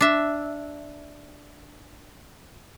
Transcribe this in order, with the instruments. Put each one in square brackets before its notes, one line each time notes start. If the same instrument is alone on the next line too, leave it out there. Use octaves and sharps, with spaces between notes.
[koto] D4 E5